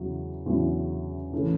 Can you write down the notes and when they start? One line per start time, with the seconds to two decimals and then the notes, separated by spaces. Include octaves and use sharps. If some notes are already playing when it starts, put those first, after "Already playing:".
Already playing: E2 C#3 F#3 E4
0.46 E2 C#3 F#3 C#4 E4
1.32 A1 E3 A3 C#4